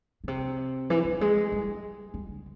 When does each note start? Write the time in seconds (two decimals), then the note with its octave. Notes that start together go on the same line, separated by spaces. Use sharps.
0.24 B2
0.28 C3
0.90 E3
1.05 F#3
1.21 G#3
1.52 G3
2.14 G3
2.29 C#3